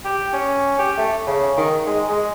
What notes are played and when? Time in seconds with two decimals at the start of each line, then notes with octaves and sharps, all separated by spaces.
0.05 G4
0.33 C#4
0.79 G4
0.97 A3
1.27 C#3
1.57 D#3
1.87 G#3
2.09 G#3